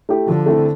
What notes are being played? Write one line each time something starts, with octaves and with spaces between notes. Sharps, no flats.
A3 E4 G4
D3 F3
A3 C4 E4 A4